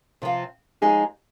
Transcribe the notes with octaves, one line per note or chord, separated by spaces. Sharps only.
C3 F3 C4 F4
F3 G#3 D#4 G#4